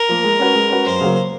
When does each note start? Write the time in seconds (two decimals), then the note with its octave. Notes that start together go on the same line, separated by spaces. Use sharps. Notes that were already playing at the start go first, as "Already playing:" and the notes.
Already playing: A#4
0.09 F3 A#3
0.24 G#3
0.39 C#4 F#4 B4
0.55 G#3
0.70 C#4 F#4 B4
0.86 F#2 C5
1.01 C#3 F#3 A#3